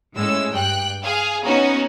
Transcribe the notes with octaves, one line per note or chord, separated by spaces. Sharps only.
A2 G#3 C#4 E6
G2 G5 F#6
G#4 F5
B3 C#4 D#4 F#4